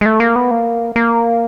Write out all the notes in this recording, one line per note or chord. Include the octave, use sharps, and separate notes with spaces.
G#3
A3
A#3
B3
A#3
A#3